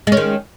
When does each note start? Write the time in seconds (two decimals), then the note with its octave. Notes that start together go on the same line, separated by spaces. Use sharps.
0.07 G#3
0.12 C#4
0.17 D#3